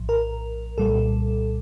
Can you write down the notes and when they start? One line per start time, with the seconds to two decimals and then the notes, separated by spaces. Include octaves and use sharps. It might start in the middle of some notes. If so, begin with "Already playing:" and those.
Already playing: A#1 A2 F3
0.09 A#4
0.78 C2 A#2 G3 A4